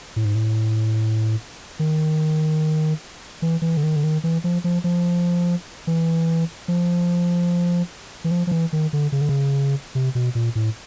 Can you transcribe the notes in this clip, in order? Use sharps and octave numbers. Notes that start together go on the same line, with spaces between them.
A2
G#2
A2
D#3
E3
E3
D3
D#3
D3
D#3
E3
F3
F3
F3
E3
F3
E3
F3
F3
E3
D#3
D3
C#3
D3
C#3
C3
B2
A#2
A2